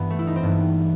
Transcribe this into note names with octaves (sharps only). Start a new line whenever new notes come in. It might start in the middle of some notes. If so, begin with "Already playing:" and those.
Already playing: G2 E3 B3
A3
E4
D#4
C4
G2 E3 B3